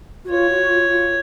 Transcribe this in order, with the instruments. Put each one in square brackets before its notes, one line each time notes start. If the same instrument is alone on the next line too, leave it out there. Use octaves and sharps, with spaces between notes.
[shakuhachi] F#4
[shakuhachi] F4 [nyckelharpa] C#5
[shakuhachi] F#4
F4
F4